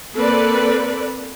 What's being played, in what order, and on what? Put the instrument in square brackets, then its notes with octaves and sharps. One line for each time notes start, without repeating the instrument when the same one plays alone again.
[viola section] A#3 C4 A4 B4 D5